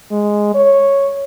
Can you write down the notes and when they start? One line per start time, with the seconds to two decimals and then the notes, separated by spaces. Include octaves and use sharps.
0.11 G#3
0.54 C#5